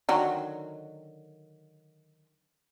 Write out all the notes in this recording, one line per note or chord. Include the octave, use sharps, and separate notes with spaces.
D3 D#3 F#3